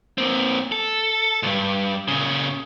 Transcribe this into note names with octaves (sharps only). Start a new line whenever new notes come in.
A#3 C4
A4
C#2 G2
A#2 C#3